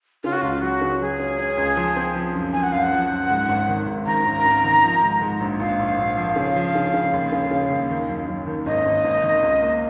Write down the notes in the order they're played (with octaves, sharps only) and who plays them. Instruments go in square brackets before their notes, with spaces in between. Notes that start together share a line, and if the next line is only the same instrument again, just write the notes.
[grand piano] C#3 [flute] F4
[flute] F#4
[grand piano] C#2 [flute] F4
[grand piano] F#3 [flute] F#4
[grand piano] C#3
[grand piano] F#3 [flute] G#4
[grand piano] C#4
C#4
C#2
F3
C4
F3
F#2
[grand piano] F3 [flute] G#5
[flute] F#5
[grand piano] F#2 [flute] F5
[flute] F#5
[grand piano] F3
F#2
G#2
G#1
D#3
G#2
[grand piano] D#3 [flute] A#5
[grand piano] G#1
G#1
D#3
F3
G#2
G#2
A#1
[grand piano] A#1 [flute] F5
[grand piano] A#1
A#1
F3
C#3
F3
C#3
C#3
D#2
C#3
C#3
D#2
D#3
F#2
F#2
D#3
[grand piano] G#1 [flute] D#5
[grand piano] G#1
G#1
D#3
C#2
A#3